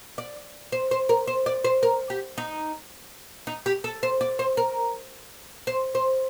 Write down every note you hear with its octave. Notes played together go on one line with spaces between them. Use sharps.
D5
C5
C5
A#4
C5
D5
C5
A#4
G4
D#4
D#4
G4
A4
C5
D5
C5
A#4
C5
C5